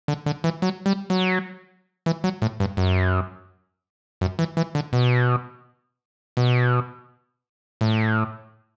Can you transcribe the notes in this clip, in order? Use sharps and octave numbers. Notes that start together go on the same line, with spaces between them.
D3
D3
E3
F#3
G3
F#3
E3
F#3
A2
G2
F#2
F#2
E3
E3
D3
B2
B2
A2